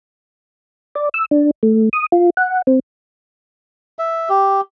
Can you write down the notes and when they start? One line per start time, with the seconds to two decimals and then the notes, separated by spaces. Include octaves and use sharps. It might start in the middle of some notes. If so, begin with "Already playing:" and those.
0.95 D5
1.14 E6
1.31 D4
1.63 A3
1.93 D#6
2.12 F4
2.37 F#5
2.67 C4
3.99 E5
4.29 G4